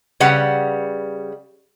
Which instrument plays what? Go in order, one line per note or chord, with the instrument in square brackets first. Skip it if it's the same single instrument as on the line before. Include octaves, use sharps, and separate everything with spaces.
[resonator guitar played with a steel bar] C#3 G3 B4 F#5